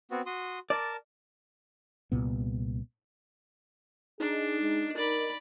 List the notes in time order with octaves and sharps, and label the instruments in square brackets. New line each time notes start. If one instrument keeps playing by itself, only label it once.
[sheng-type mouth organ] B3 C4 F#4
F#4 C6 D#6
[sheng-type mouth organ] A#4 A5 [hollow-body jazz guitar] D5
[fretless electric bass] C2 A#2 B3
[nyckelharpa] D4 [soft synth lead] D#4 [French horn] G#4
[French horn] G#3
[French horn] A#4 [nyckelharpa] D5 B5